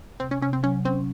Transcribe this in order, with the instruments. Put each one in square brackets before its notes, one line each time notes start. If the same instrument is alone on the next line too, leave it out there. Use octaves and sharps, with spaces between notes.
[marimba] C3 [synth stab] C4
[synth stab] C#4
[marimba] C3 [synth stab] C#4
[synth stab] C4
[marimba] F#3 [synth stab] C#4
[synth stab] C4 [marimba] C#4